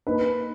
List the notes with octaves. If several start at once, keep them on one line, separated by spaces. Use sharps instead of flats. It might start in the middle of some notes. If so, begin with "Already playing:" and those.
A#3 D#4 B4